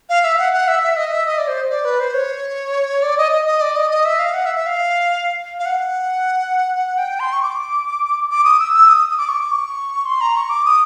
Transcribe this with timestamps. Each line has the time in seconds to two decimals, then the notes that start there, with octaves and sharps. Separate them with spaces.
0.09 F5
0.24 E5
0.39 F#5
0.53 F#5
0.68 E5
0.83 E5
0.97 D#5
1.12 E5
1.26 D#5
1.38 D5
1.48 C5
1.70 D5
1.85 B4
2.00 C5
2.14 C#5
3.02 D5
3.17 D#5
3.32 D#5
3.46 D#5
3.61 D5
3.76 D#5
3.91 D#5
4.05 E5
4.19 F5
4.34 F#5
4.46 E5
4.56 E5
4.67 F5
5.59 F5
5.66 F#5
6.98 G5
7.20 C6
7.33 C#6
7.43 D6
8.30 D6
8.44 D#6
8.59 E6
8.74 E6
8.89 D#6
9.10 D#6
9.18 D6
9.29 C#6
9.40 D6
9.51 C#6
10.06 C6
10.21 A#5
10.36 C#6
10.50 D6
10.65 D#6